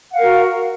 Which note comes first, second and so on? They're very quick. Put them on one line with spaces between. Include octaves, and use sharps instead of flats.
F#5 F5 A#4 F#4